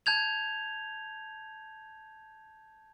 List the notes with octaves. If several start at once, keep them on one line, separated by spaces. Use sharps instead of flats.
A5 G6 G#6 F7